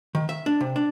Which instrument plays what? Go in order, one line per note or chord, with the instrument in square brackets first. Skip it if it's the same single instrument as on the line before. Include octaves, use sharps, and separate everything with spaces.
[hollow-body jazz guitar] D#3
E5
D4
C3
D4